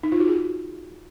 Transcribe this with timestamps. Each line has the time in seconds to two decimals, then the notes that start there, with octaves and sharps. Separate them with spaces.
0.03 D#4
0.12 F4
0.20 F#4
0.28 G#4